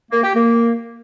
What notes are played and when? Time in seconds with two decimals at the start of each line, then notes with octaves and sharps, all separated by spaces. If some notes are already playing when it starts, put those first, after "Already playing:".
0.11 A#3
0.23 G4
0.34 A#3